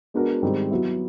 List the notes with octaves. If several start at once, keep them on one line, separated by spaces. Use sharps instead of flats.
G#3 B3 D4 F#4 A#4
G#2 D#3 G3 C4 D#4
F#3 B3 E4